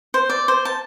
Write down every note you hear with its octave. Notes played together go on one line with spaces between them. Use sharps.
C5
D5
C5
A5